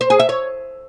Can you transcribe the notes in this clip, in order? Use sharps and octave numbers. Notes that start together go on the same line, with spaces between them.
C5
G#4
E5
C#5